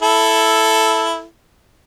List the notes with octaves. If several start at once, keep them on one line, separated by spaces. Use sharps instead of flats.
E4 A4